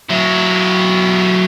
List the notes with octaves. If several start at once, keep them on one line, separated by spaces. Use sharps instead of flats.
F#3 E4